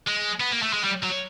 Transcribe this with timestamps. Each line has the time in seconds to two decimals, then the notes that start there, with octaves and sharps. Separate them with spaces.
0.08 G#3
0.40 B3
0.52 A#3
0.62 A3
0.73 G#3
0.84 G3
1.03 F#3